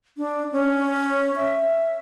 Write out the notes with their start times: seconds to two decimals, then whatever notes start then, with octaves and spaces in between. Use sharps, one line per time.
0.18 D4
0.52 C#4
1.36 E5